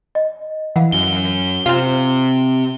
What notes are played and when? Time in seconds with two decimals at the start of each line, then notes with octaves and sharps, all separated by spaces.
0.15 D#5
0.76 E3 F5 F#5
0.92 F#2 G7
1.66 C3 C4 F4